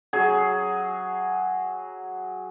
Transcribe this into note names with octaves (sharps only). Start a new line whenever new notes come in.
F#3 G#4